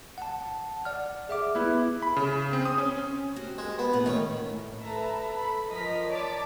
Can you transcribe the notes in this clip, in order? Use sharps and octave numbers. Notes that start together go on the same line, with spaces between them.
F#5 A5
D5 F#5 F6
G#4 E5 D6
B3 E4
B5
C#3
C4
D#6
C#4
F#4 G4 C5
G#3
B3
A#2 F4 F#5
D#3 A3 C#4 C#5
A2
A4 B4 E5 A5 A#5
A4 B5
F3 A#4 D#5 B6
C#5 D5 A5 D6